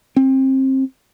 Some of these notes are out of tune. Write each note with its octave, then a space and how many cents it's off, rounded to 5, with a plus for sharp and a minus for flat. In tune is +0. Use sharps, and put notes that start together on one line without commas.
C4 +25